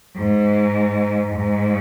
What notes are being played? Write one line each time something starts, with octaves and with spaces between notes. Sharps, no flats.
G#2
G#2